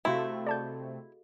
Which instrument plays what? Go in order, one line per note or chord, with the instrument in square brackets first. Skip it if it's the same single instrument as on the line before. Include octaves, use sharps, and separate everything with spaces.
[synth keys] C3 A3 C4 [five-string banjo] E4 [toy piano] F#4 G4 F5
[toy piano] G#4 A4 D#5 [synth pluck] D5 A5 G6